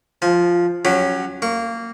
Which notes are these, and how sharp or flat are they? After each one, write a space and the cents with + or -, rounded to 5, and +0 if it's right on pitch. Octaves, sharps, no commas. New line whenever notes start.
F3 +0 G#5 +35
F#3 +0 C#4 +0 G4 +35
A#3 -15 C#6 +0